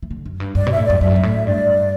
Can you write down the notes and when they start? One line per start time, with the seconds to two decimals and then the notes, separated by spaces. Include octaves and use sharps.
0.03 E3
0.11 D3
0.25 F#2
0.40 G2
0.55 G2 D5
0.67 B2 E5
0.78 A2
0.86 F#2 D5
1.01 F#2 E5
1.16 G2
1.23 A2
1.46 G2 D5